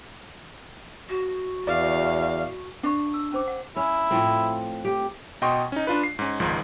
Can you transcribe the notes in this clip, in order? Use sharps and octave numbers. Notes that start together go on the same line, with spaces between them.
F#4
E2 D5 F5
D4 F5 C#6
E6
C#4 C5 D6
F#5
C#4 E4
A2 F3 C4
G4
B2 D#5 G5 C6 C#6
C#4 D#4
D4 F4 B4
C7
G#2 C#4
G#1 C#2 G#2 F3